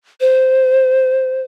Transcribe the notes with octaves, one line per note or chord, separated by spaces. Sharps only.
C5